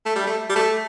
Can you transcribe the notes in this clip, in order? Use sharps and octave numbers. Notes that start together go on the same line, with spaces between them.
A3
G3
A3
G3
A3